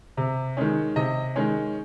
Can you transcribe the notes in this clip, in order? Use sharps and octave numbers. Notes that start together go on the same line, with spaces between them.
C3
D#3 G#3 C#4
C3 D#5
D#3 G#3 C#4